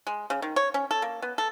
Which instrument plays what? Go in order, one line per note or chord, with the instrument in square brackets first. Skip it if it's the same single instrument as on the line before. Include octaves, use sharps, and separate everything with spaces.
[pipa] G#3
C#3
D#3
C#5
C#4
A4
A#3
B3
A4